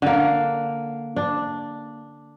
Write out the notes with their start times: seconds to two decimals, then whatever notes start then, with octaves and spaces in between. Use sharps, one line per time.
0.02 D3 A#3
1.16 D4